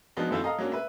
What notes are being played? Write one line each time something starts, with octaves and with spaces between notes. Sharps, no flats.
F3 G#3 B3 D4 D#4 F#4
F#2 D#3 A3 C4 E4 F4
A4 D#5 F5 A#5
F#3 G#3 A#3 C#4 D4
B4 E5